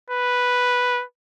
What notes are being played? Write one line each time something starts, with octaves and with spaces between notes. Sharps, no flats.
B4